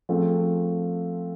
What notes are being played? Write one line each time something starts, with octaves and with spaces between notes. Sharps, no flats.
F3 A3 C4 G#4